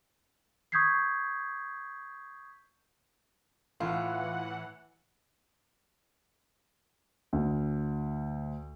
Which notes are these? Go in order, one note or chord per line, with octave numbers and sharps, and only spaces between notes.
C#6 D#6 G6 G#6 B6 C7
A2 E3 F4 F#5
D2